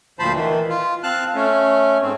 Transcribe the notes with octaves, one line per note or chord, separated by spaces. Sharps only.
D2 A#2 F3 C5 A5 B5
D#3 E3
F4
C4 F5 A5 F#6
A3 C#4
G#2 C4